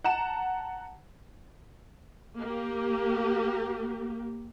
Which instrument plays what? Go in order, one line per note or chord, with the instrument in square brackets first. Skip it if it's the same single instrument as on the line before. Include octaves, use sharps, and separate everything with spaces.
[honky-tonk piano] F#5 A5 A#5 E7
[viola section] A#3 G4